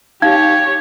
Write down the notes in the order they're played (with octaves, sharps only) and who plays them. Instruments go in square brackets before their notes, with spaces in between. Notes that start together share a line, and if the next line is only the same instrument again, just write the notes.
[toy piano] D#4 F5 [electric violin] G4 C#5 [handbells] G#6